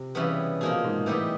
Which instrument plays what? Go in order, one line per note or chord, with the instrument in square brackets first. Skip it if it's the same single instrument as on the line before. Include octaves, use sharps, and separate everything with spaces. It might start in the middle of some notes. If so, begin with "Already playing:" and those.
Already playing: [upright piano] C3
[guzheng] C#3 E3 G3 B3
[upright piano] B2 [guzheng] F3 A#3 D#4 G#4
[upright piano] A#2
G#2
[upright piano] A2 [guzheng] E3 G3 B3 D#4 G4